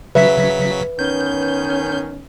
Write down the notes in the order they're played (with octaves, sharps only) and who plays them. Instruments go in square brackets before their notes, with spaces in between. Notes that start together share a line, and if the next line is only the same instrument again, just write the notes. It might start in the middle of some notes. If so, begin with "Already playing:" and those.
[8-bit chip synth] C#3 F#3 B6 [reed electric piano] B4 [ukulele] E5
[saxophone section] D#3 B3 C#4 [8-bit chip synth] G6